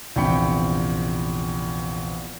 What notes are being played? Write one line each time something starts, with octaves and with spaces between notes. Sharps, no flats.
A#1 E2 C3 G5 B5 C#7